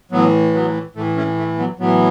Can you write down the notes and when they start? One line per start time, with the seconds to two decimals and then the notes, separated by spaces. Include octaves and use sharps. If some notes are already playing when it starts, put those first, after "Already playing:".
0.12 A2 E3 F#3 B3
0.54 F#3 B3
0.95 A2 E3 A3
1.17 A3 C#4
1.38 A3
1.58 F#3 B3
1.79 A2 E3 F#3 B3